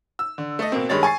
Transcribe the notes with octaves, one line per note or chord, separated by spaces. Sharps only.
E6
D3
A3 A4 D#5
B2 A#3 C4
G2 D#3 G#3 C#5 A6
G#5 C#6 A6 C7